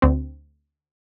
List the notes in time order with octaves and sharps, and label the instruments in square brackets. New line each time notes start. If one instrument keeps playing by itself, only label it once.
[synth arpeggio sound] D2 C4